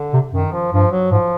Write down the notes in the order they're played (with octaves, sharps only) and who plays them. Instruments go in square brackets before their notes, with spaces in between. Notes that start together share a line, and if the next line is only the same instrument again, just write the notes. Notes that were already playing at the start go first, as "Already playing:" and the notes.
Already playing: [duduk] D3
[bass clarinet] C3
[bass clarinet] F#2 [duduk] D#3
[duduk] F3
[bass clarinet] G2 [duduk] F3
[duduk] F#3
[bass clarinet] G#2 [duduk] F3